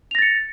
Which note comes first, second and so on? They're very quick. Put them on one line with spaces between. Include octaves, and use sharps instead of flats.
F7 A#6 A6 C#7